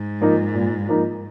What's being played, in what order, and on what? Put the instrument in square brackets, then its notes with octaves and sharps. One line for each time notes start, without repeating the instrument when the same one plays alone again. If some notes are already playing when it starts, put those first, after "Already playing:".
Already playing: [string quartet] G#2
[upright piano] F3 A#3 D#4
A#2
F3 A#3 D#4